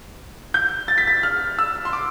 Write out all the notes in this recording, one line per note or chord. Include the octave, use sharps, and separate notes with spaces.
G6
A6
B6
A6
F6
E6
C6
D6